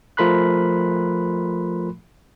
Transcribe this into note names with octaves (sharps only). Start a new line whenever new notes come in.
F3 A3 A#4 B5 C6 F#6